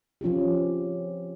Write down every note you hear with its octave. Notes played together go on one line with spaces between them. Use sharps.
F3 C#4 F4 G4